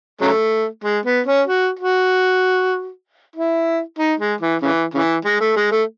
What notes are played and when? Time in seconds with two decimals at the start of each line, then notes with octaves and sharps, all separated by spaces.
0.22 C#3 F#3 A3
0.84 G#3
1.06 B3
1.27 C#4
1.47 F#4
1.79 F#4
3.36 E4
3.99 D#4
4.20 G#3
4.41 E3
4.62 C#3 E3
4.94 C#3 E3
5.25 G#3
5.41 A3
5.56 G#3
5.72 A3